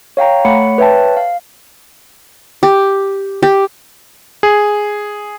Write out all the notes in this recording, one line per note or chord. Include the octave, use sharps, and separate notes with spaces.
C#5 F5 G5 A#5
A3 C#5 F#5 B5 C#7
B4 C#5 E5 G5 A5
F5
G4
G4
G#4